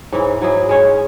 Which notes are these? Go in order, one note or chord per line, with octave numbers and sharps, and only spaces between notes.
G#2 E3 C#4 E4
G#2 F#3 E4 G#4
G#3 C#4 G#4 C#5